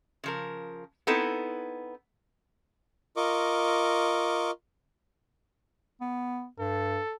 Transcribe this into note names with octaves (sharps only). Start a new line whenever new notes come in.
C#3 F3 A#4
B3 C4 D#4 E4 A4
F4 A#4 D#5 C#6 D6
B3
G2 A4